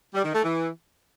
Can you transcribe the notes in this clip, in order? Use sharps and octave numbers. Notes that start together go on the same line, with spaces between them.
G3
D#3
A3
E3